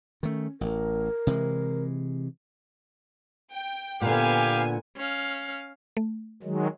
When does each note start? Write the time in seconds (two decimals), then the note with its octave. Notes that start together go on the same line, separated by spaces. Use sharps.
0.23 D#3 A3 C#4
0.61 A1 A#4
1.27 C3 E3 G#3
3.52 G5
4.02 A#2 D3 B3 G4 F5 G#5
4.97 C#4 F5
5.97 A3
6.43 D#3 F#3 G#3